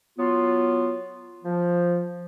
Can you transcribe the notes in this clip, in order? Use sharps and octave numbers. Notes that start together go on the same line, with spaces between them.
F#3 B3 F4
F3